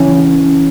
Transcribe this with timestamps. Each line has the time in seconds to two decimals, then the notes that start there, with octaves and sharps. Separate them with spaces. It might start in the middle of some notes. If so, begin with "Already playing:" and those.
Already playing: C#3 E3 C#4